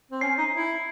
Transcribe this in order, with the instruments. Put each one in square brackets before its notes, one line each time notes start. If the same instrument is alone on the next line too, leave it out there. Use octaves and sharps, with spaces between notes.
[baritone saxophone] C4
[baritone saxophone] C#4 [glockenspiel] C7
[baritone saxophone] D#4
E4